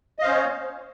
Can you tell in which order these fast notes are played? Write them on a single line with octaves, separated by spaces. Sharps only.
D#5 F5 C5 C#4 C#5